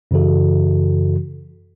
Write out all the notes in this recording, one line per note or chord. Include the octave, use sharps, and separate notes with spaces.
F#2 C#3 E3 F#4 A4